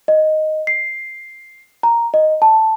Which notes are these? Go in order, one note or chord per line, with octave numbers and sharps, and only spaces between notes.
D#5
C7
A#5
D#5
A5